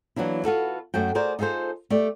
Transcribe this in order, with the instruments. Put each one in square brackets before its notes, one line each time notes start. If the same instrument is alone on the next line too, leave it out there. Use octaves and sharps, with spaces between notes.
[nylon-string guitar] E3 F#3 A#3 D4 E4
F4 F#4 A4 B4
F#2 A3 F#4 G5
F#4 G#4 A#4 C5 D5
D#4 F4 G#4 A4 C5
A3 G4 D5